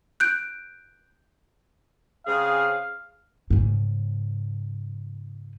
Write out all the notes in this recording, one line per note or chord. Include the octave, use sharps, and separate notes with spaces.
F#6 G6 D7
C#3 C4 G#4 F5
G#2 C#3